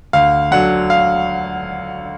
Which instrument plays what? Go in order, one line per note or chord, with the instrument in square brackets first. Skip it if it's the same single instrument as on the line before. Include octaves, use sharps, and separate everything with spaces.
[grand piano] D2 F5
D3 F#3 F#5
F5